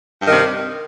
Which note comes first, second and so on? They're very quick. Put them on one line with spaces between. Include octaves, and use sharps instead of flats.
G2 D#3 C3